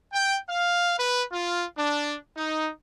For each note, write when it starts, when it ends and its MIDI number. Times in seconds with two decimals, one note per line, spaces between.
0.13 0.38 79
0.49 0.95 77
0.99 1.23 71
1.32 1.64 65
1.78 2.16 62
2.37 2.70 63